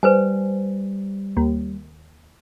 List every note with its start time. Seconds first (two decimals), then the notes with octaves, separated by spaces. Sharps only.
0.03 G3 B4 C5 G#5
1.37 D#2